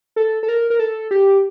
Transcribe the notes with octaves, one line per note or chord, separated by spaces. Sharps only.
A4
A4
A#4
A#4
A4
G4